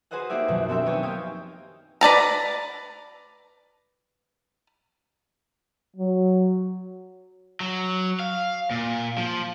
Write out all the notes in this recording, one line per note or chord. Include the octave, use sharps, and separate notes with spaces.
F#4 G#4 B4 C5 D#5 F#5
A#3 D#4 G4 D5 E5
C2 F#2 B2 D#3 F3
B3 C4 D4 G4 E5
D#4 B4 C#5 D#5 G5 G#5
A#3 D#5 F5 G5
B4 D5 A5 A#5
F#3
F#3
F5
A#2
F3